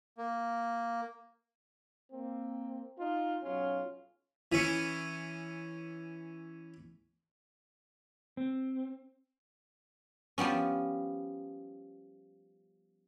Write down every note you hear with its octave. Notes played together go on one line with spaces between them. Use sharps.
A#3
A#3 C4
D#4 F4
B1 F#3 C#4 F4
E3 C#4
C4
F3 G3 B3 C#4